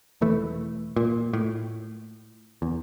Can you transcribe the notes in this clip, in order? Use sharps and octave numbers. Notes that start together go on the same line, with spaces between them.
E1 E3 A3
A#2
A2
E2